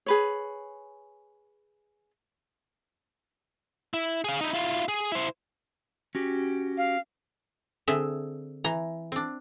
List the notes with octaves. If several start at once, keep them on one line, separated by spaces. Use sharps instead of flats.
G#4 B4 C#5
E4
G#4 F5
D#4 E4
E4 F4
G#4
E4 C5
C#4 F#4 G4
F5
D3 C4 G#4 E5
E3 A#5
C4 D4